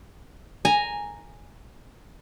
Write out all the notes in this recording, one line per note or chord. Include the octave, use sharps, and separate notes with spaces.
G#5 A#5